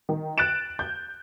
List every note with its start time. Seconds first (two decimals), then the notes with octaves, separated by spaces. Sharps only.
0.09 D#3
0.38 F#6 A6 D7 E7
0.79 G6